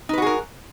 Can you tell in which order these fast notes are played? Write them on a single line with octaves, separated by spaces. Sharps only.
D#4 B4 F#4 G#4 A#4